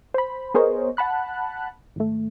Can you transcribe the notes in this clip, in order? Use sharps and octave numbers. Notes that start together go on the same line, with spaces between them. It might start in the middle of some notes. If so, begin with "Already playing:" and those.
C5 B5
B3 G#4 A#4 C5 C#5 D#5
F#5 A5 B5 F#6
G#1 A3